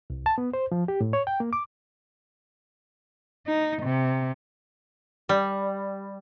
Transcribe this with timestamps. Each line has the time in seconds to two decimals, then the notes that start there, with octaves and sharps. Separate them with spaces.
0.10 C2
0.26 A5
0.38 B3
0.53 C5
0.72 F3
0.88 G4
1.01 A2
1.13 C#5
1.27 G5
1.40 A#3
1.53 D6
3.46 D#4
3.82 C3
5.29 G3